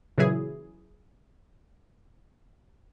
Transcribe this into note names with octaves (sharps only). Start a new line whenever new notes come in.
A#2 C#3 E3 F#3 E4 G#4